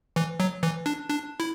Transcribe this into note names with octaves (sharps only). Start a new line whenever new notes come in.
E3
F#3
E3
D4
D4
E4